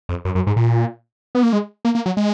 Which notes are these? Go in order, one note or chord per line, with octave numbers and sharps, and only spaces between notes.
F2
F#2
F#2
G#2
A#2
B3
A#3
G#3
A#3
A#3
F#3
G#3